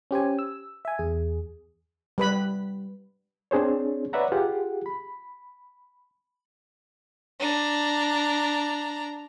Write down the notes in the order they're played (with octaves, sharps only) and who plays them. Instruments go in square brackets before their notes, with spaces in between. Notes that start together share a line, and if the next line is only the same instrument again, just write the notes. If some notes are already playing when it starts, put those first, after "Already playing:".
[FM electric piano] C#4 G4 C5 G#5
E6
E5 G#5
E2 G#4
[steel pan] G3 B4 B5
[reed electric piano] C4 D4 G#4 C5 C#5
B4 C#5 D5 E5 F#5 A#5
F4 G4 G#4 F#5
B5
[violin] D4 A#5